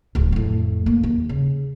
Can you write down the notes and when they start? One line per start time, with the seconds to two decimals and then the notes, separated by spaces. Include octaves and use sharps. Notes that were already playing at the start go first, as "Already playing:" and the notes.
0.15 D1 D2
0.32 F2 A2
0.86 A#3
1.03 D#2
1.29 C#3